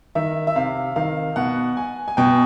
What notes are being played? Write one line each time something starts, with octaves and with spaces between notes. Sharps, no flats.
D#3 E5
E5
C3 F5
D#3 F5
B2 F#5
G#5
G#5
B2 G5